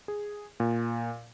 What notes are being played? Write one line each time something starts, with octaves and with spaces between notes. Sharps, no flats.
G#4
A#2